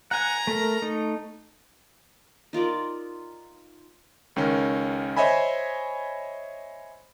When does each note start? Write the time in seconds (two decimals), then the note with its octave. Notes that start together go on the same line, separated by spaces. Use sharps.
0.11 F#5 G#5 A#5
0.47 A3 A#4
0.82 A3 D#4
2.53 D#4 F4 A#4 D5
4.36 C#2 D#3 C#4
5.17 C5 C#5 D#5 E5 G#5 B5